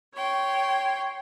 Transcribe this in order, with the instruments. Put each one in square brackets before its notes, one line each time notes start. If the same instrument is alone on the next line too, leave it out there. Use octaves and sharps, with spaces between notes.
[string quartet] C#5 G5 C6